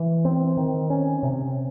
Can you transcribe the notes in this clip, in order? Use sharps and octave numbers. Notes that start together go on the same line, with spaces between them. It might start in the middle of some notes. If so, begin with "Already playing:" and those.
Already playing: E3
C4
D#3
C#4
C3